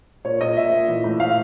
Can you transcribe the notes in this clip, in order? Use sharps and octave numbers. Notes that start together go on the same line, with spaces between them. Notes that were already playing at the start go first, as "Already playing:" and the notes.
A#2 C#5
A#2 D#5
A#2 E5
A#2
E3
A2
A2 F5